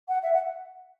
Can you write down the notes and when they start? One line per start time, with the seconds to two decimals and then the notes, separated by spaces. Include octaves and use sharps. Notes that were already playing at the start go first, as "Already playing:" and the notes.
0.08 F#5
0.22 E5
0.33 F#5